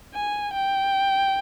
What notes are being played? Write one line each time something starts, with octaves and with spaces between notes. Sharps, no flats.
G#5
G5